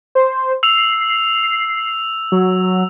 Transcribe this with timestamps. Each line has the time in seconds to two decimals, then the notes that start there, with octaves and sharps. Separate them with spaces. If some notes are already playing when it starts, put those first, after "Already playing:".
0.15 C5
0.63 E6 C7 F7
2.32 F#3